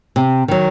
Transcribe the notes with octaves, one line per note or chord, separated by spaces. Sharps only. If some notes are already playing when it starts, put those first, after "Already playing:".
C3
D#3 F#3